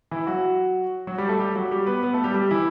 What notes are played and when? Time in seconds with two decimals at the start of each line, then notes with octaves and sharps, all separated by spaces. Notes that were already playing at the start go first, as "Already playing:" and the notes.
0.11 E3 E4
0.27 F#3 F#4
1.07 F#3 F#4
1.18 G3 G4
1.28 A3 A4
1.39 G3 G4
1.55 F#3 F#4
1.71 G3 G4
1.87 B3 B4
2.03 B3 B4
2.13 A3 A4
2.24 G3 G4
2.34 G3 G4
2.51 E3 E4